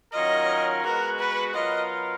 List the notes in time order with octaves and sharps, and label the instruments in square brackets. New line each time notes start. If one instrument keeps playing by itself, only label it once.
[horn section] D#3 F#3 C#4 F4 A#4 [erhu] D#5
[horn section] G#3 B3 F#4 [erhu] A#4
[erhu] B4
[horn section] F#3 B3 F4 A#4 [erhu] D#5